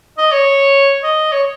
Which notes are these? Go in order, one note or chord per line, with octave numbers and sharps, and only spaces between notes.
D#5
C#5
D#5
C#5